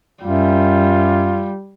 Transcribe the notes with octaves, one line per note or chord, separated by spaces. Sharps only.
F#2 G3 F4